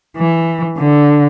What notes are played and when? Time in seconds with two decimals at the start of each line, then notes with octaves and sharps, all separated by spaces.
0.17 E3
0.78 D3